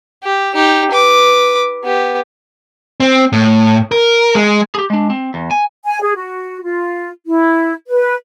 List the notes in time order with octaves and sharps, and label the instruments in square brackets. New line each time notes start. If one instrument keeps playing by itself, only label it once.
[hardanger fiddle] G4
D#4 G4
B4 D6
B3 G4
[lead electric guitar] C4
A2
A#4
G#3
G4 G#4
G#3 D4
C4
E2
G#5
[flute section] G#5
G#4
F#4
F4
E4
B4